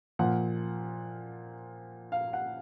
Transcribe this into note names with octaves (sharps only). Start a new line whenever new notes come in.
A#2 F3 F#5
F5
F#5